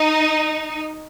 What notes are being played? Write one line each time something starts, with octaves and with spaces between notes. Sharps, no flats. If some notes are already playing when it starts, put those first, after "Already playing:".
Already playing: D#4